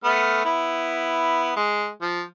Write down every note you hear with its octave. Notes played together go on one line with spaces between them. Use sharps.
A3 B3 F6
B3 E4
G#3
F3